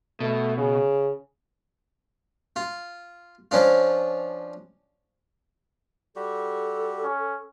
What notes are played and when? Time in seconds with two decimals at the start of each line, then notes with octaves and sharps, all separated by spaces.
0.20 B2 A3
0.58 C#3
2.56 F4
3.51 F3 C#4 D4 F4
6.16 G3 F#4 G4 A4
7.04 C#4